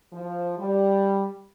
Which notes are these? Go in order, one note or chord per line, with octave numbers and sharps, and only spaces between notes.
F3
G3